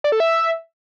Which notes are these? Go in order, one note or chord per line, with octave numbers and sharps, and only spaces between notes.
D5
A4
E5